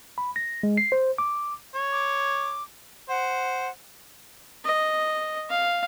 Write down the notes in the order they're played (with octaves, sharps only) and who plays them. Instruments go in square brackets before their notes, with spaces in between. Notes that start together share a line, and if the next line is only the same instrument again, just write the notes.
[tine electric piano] B5
A#6
G#3
C7
C5
D6
[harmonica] C#5
[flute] D6
[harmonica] C5 [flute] F#5
[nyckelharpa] D#5
F5